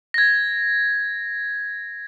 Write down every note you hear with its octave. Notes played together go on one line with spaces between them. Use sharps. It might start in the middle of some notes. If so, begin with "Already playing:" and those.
G#6 A#6